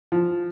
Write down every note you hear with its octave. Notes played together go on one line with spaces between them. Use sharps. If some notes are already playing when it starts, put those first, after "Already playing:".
F3